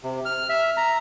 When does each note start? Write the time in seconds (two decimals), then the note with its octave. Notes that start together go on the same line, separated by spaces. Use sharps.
0.04 C3
0.25 F6
0.49 E5
0.77 A#5